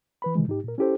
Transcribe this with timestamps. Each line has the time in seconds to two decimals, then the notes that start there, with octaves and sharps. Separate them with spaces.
0.22 E3 B4 B5
0.35 C3 D#3 E3 G#3
0.47 G#2 D#4 G4
0.64 A#2 A#4
0.78 C#4 E4 G4 A4 C5